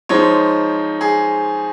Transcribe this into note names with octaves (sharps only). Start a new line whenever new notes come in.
F3 G#3 C4 D#4 C#5
G#4